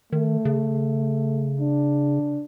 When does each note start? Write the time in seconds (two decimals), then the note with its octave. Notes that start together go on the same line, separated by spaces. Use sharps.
0.12 D#3 A3
0.45 C#3
1.60 D4